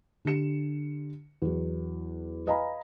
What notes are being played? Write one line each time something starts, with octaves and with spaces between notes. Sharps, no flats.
D3 D4 G4 C#7 E7
E2 F#3
B4 D#5 F5 G#5 A#5 B5